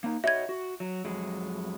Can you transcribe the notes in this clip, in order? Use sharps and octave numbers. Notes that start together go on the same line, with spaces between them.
A#3 D#4
F#4 C#5 D#5 E5 G#6
F#4
F#3
F2 F#3 G#3